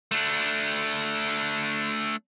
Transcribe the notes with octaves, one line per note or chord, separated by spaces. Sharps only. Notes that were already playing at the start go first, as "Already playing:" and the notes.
A3 D4